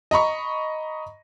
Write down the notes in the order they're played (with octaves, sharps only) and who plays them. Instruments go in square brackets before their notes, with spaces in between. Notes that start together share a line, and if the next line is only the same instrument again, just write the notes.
[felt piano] D#5 A#5 B5 C#6